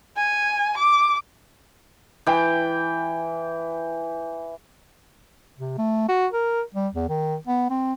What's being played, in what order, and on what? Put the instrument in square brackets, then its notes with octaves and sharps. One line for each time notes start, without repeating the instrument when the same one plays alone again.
[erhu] G#5
D6
[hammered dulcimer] E3 G5
[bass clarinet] C3
A3
F#4
A#4
G3
E2
D#3
B3
C4